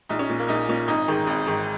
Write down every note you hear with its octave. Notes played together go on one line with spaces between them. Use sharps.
A#1 D#4
C#4
A#2
A#3
A#1 D#4
A#2 C#4
G#1 D#4
G#2 D#3
G#1
G#2 D#3